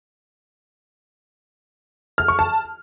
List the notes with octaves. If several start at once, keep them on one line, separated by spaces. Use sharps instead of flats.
F6
C#6
A5